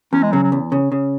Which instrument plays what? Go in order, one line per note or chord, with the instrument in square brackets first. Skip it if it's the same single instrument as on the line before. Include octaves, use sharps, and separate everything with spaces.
[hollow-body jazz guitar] E2 [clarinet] C#4
[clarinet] G#3
[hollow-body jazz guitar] C#3 [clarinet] F#3
[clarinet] F#3
[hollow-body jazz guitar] E2
C#3
C#3